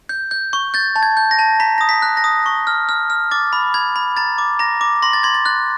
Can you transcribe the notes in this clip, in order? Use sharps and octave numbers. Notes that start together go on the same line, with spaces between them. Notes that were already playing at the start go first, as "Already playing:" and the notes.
G6
G6
C#6
G6 A6
A5
G#6
G6
A#6
A5
A#5 B6
D#6 A#6
B6
F#6
A#6
D#6
C#6
F6
F6
F6
D6 A6
B5
B5 G#6
B5
A#5 A6
D6
A#5 A#6
D6
C6 A#6
A6
C6 G#6
A6
F#6 A6